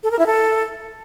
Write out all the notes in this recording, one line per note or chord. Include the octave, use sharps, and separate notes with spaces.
A4
A#4
E4
A4